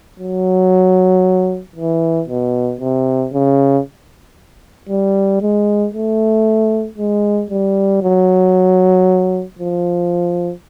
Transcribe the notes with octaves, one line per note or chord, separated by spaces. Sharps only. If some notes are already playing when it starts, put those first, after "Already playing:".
F#3
E3
B2
C3
C#3
G3
G#3
A3
G#3
G3
F#3
F3